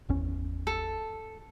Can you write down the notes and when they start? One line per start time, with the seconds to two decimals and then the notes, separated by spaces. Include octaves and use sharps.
0.09 G#1 E2 C#4
0.67 A4